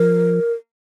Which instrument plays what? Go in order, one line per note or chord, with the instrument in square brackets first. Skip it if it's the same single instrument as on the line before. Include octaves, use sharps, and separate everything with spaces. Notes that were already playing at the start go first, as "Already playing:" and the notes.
Already playing: [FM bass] F3 [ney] A#4